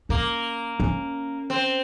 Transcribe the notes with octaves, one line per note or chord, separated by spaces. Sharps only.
A#3 C#4
C#4
C4